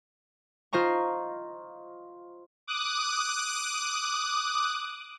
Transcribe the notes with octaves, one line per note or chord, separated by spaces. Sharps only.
F4 C5 D#5 A#5 C#6
D6 D#6 F#6